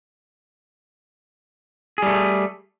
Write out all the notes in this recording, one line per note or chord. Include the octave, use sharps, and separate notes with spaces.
G3 A3 G#4